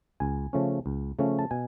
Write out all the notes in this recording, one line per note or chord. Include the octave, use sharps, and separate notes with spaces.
C#2 G#5
C#3 F3 A3 C#4
C#2
C#3 F3 A3 C#4
A5
B2 G#5